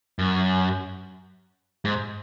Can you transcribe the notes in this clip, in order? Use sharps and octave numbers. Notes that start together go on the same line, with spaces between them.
F#2
G#2